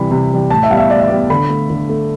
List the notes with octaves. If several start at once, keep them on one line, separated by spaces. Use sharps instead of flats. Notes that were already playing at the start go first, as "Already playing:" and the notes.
Already playing: C3 E3 G3 B5
C3
E3 G3
A2 A5
E5
G3 B3 F5
E5
A2 D5
E5
G3 B3 D5
D3 B5
A3
D3
A3